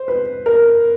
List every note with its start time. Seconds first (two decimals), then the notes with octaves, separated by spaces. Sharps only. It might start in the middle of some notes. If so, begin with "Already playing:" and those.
Already playing: C5
0.08 B4
0.46 A#4